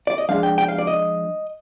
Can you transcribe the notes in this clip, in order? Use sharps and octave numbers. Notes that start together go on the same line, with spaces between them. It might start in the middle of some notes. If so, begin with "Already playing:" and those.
D5
D#5
F3 G#3 D4 F5
G5
G5
F5
D5
D#5